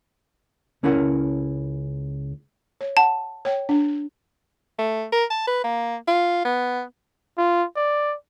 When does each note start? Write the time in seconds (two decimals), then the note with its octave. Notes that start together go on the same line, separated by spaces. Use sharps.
0.83 C#2 C#4 E4 A#4 F#5
2.81 C#5
2.97 F#5 A5
3.45 C#5 G5
3.69 D4
4.79 A3
5.13 A#4
5.31 A5
5.48 B4
5.64 A#3
6.08 F4
6.45 B3
7.38 F4
7.76 D5